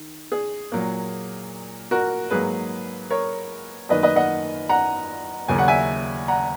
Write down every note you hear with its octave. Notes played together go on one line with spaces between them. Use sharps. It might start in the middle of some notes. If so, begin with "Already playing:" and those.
Already playing: D#3
G#4
A#2 F#3 A#3
F#4 A#4
G#2 F#3 A#3 G#4 B4
A#4 C#5
F#2 D#3 A#3 B4 D#5
B4 D#5
D#5 F#5
F#5 A#5
D#2 C#3 F#3 A#3 G#5
F#5
E5 G#5
F#5 A#5